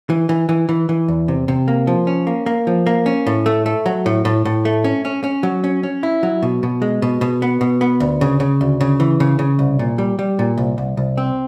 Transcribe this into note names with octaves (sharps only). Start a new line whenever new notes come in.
E3
E3
E3
E3
E3
E2
C3
C3
A#3
F3
C#4
A#3
A#3
F3
A#3
C#4
A2
A3
A3
F#3
A2
A2
A2
A3
C#4
C#4
C#4
F#3
C#4
C#4
E4
F#3
B2
B2
G#3
B2
B2
B3
B2
B3
D2
C#3
C#3
D2
C#3
E3
C#3
C#3
C2
A#2
G3
G3
A#2
C2
C2
C2
C4